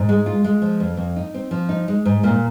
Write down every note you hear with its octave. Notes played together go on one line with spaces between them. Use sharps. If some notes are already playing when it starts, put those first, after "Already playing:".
Already playing: G#2
G#3
F4
G#3
F3
F2
F2
D#4
C4
F3
D#4
G#3
G#2
A#2